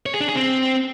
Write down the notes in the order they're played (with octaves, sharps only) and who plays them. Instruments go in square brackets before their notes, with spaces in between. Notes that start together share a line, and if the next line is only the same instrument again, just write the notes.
[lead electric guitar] C#5
G#4
D4
G#4
C4